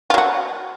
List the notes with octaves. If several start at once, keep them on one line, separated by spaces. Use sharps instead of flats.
F#3 F4 F#4